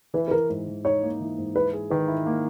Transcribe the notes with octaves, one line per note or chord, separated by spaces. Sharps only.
E3 B4
B4
E3 A#4
G#2
E3
D#4 C#5
A#3
E3
G#2
E4 B4
G#4
D#3 B4
E4
A#3